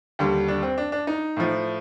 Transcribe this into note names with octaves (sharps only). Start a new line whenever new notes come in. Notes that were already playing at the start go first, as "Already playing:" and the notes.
D#2 D3 G3 G4
D4
C4
D4
D4
D#4
A2 F3